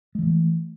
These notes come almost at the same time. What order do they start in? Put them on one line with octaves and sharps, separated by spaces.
G#3 E3 A3